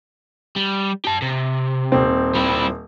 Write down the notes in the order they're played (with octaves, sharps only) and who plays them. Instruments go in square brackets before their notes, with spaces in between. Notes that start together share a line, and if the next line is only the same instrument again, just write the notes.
[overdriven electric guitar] G3
G4 A5
C3
[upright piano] D#1 C4
[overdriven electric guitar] G3 E4